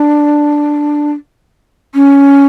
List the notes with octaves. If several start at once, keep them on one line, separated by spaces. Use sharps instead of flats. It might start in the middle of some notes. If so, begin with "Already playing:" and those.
Already playing: D4
C#4